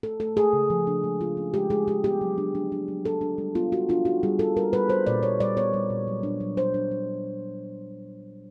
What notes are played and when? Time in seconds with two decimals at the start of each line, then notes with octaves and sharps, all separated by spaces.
0.03 A3 A4
0.20 A3 A4
0.36 A3 G#4
0.53 C#3
0.70 F3
0.87 D4
1.04 G#3
1.21 F4
1.37 C#4
1.54 G#3 G4
1.70 G#3 G#4
1.88 G#3 G4
2.04 B3 G4
2.21 F#3
2.38 D4
2.55 D4
2.72 D4
2.88 F#3
3.05 D4 A4
3.21 D4
3.38 G3
3.55 B3 F4
3.72 D4 F#4
3.89 D4 F4
4.05 D#4 F#4
4.23 G3 G#4
4.39 G3 A4
4.56 G3 A#4
4.73 G3 B4
4.89 G3 C5
5.06 A#2 D5
5.23 A#2 C#5
5.40 G3 D5
5.57 B3 C#5
5.73 G3
5.90 A#2
6.07 F#3
6.23 D4
6.40 F#3
6.57 D4 C5
6.74 D4
6.91 D4